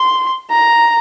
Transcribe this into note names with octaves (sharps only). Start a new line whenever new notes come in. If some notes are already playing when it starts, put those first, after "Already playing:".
Already playing: C6
A#5